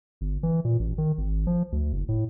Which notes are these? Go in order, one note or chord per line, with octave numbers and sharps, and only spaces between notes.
G1
E3
A#2
A1
D#3
G#1
F3
D2
F#1
A2